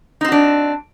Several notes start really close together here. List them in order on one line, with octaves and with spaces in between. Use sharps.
D#4 C4 F#4 D4